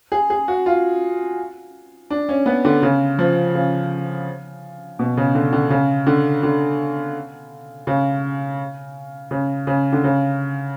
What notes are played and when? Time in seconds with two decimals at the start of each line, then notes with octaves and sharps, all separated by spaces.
0.12 G#4
0.30 G#4
0.48 F#4
0.66 F4
2.10 D4
2.29 C#4
2.46 B3
2.65 D3
2.82 C#3
3.19 F3
3.55 C#3
4.99 B2
5.17 C#3
5.35 D3
5.53 D3
5.70 C#3
6.07 D3
6.43 D3
7.87 C#3
9.31 C#3
9.67 C#3
9.92 D3
10.04 C#3